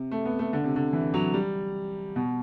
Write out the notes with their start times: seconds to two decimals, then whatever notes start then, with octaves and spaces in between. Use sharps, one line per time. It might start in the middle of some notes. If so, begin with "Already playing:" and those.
Already playing: C3
0.11 A3
0.26 B3
0.39 A3
0.53 D3
0.64 C3
0.76 D3
0.93 E3
1.14 F#3
1.34 G3
2.16 B2